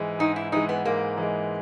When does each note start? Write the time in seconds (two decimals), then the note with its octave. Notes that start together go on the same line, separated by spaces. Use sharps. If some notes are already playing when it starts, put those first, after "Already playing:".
Already playing: G#2 E3 G#3
0.19 G#2 D#4
0.36 E4
0.52 E3 G#3 D#4
0.69 B3
0.85 G#2 A#3
1.18 E3 G#3